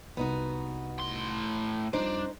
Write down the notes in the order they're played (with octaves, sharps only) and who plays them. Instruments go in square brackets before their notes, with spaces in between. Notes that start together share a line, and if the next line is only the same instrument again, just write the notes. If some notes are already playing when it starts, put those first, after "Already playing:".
[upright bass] C2 [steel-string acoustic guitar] B3 D#4 F#4
[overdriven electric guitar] A2 C6
[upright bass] F2 G3 [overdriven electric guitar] D4 [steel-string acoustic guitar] D#4 C5